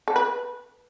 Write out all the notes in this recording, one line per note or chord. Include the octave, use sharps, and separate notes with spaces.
A4
B4